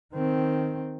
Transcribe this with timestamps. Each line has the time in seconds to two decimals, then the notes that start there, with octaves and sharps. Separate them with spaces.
0.13 D#3 C4